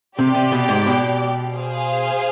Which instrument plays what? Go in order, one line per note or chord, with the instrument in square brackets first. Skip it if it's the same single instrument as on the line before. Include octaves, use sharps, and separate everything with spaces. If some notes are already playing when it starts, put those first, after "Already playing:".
[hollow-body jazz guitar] C3 [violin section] G4 D5 G5
[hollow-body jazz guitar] C3
B2
G#2
B2
[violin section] G#4 C5 F5